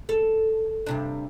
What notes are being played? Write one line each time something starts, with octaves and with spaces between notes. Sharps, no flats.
A4
G2 C3 D4